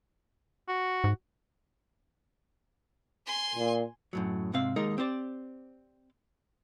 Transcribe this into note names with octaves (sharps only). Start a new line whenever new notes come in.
F#4
G#2
G#5 C6
A#2
F#2 A2 F#3
G#2 C3 C4 F5
D#2 G#3 D#4 A#4
C4 G4 C5 D5